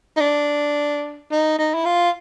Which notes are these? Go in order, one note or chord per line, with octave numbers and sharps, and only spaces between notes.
D#4
D4
D#4
D#4
E4
F4